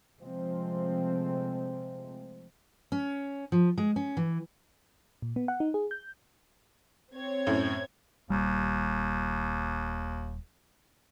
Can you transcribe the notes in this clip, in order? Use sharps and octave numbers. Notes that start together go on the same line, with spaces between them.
C3 F3 G#3 A3 C4
C#4
F3
G#3
C#4
E3
A#2
B3
F#5
D#4
G#4
G6
C4 C#5 G#6
F#2 A2
D#1 G#1 D#2 G3